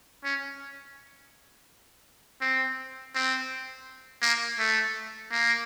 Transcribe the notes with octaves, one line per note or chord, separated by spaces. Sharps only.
C#4
C4
C4
A#3
A3
A#3